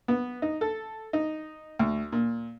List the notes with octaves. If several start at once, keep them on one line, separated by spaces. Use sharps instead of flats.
B3
D#4
A4
D#4
D2
A#2